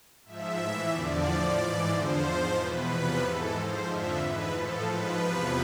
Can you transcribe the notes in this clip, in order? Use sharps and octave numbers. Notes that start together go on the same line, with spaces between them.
G#2 F3 E5
A2 E3
E2 D3 F3 D5
A2 F3
G#2 E3 D5
E2 D3 F3 C5
G#2 F3
E2 B2 B4
E2 C3 F3 B4
G#2 E3 A4
G#2 F3 C5
F2 D3 F3 E5
G#2 E3 B4
A2 F3 A4
G#2 F3 B4
E2 C3 F3